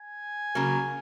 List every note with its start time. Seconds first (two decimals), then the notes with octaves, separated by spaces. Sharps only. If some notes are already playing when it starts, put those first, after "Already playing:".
Already playing: G#5
0.55 C#3 F#3 A#3